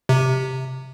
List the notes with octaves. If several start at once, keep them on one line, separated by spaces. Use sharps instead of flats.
C3